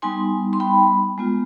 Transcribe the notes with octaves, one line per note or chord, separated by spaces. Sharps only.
G3 B3 D#4 G#5 C6
C6
G5 B5
G#3 B3 F4